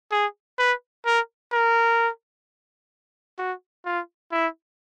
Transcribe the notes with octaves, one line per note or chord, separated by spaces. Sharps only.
G#4
B4
A#4
A#4
F#4
F4
E4